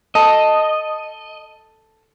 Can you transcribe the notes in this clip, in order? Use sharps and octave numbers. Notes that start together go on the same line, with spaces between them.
A4 D#5